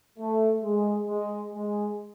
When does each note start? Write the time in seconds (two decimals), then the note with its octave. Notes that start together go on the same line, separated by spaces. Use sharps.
0.19 A3
0.63 G#3
1.08 G#3
1.53 G#3